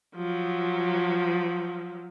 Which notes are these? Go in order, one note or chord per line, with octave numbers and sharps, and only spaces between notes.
F3 F#3